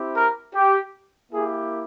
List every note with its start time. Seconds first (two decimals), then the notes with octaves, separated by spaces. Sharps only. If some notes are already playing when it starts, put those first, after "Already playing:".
Already playing: C4 E4 G4
0.15 A#4
0.54 G4
1.32 A#3 E4 G4 G#4